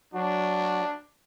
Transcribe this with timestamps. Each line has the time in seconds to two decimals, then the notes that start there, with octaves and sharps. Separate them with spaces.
0.14 F#3 D4 F#4